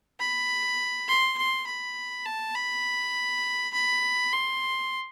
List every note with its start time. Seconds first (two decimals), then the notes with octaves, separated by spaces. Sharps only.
0.20 B5
1.08 C6
1.38 C6
1.67 B5
2.25 A5
2.56 B5
3.74 B5
4.33 C6